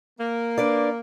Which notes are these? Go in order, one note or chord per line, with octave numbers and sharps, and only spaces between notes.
A#3
D4 B4 D5